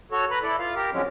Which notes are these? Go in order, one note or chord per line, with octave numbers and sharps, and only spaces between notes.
F#4 A4 C#5
B4 A#5 B5
E4 A4 D5
F4 F5
G4 A#4
D3 F3 F#3 G#3 C4 C#4